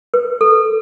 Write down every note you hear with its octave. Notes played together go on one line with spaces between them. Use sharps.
B4
A4